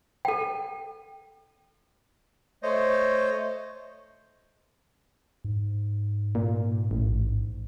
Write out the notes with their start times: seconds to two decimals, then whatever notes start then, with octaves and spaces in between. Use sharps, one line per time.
0.25 A4 G5
2.63 A3 C5 C#5 D#5
5.45 G#2
6.35 A#2
6.91 A1